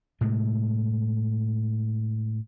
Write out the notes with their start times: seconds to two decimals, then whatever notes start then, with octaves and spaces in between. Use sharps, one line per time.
0.21 A2 C3 G#3